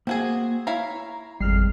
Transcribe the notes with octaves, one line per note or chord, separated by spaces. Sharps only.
A#3 C4 F#4 G#4
E4 C#5 F5 A#5
G#1 F2 G3 G#3 F6 C7